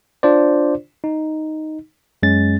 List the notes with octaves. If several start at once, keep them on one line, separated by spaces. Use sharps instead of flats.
D4 F4 C5 D5
D#4
F#2 G#3 C#4 A6